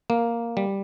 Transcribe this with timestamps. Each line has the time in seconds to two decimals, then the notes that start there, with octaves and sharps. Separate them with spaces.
0.10 A#3
0.57 G3